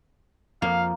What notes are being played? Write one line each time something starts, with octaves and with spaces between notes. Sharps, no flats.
F2 F3 A#3 F5